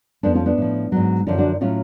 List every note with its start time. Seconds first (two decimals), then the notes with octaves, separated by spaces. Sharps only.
0.23 F2 F3 B3 D4
0.35 C#4 F4
0.46 B3 D4
0.57 A2 F3
0.92 G#2 F#3
1.27 F#2 D3 F3 C#4 F4
1.38 D4 F#4
1.61 A2 F#3 C#4 F4